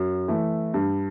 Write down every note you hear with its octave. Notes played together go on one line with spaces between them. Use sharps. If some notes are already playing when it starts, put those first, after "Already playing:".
Already playing: F#2
E3 A3
G2